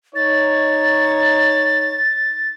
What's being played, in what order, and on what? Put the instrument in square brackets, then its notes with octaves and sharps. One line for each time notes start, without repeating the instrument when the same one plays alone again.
[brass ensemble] D#4 C#5 [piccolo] A6